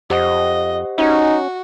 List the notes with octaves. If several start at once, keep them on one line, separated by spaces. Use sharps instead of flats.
F2 G4 C5 D#5 F#5
C#4 D#4 F#4